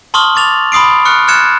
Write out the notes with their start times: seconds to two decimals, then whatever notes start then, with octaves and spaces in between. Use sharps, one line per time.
0.14 A5 C6 C#6 D#6 F6 F#7
0.35 C#6 D6 A6 F7
0.72 B5 C6 D#6 C7 D7
1.05 C#6 F6 F#6 C#7
1.28 F6 F#6 G#6 A6 C#7 E7